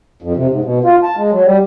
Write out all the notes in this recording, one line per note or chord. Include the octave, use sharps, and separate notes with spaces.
F2
C3
G#2
B2
F4
A5
G#3
F#3
G3